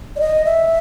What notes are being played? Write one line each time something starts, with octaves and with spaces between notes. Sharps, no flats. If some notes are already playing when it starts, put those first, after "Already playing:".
D5
D#5
E5